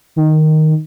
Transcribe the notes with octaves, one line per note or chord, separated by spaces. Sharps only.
D#3